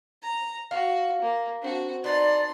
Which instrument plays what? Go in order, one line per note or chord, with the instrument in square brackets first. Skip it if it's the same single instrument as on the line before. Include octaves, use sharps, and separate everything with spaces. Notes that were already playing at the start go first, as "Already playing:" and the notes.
[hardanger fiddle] A#5
[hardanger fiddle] F#4 [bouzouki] F5
[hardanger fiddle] A#3
[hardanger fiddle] C4 F#4 [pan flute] D4
[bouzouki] B3 D4 [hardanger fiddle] D#4 C6 [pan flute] D5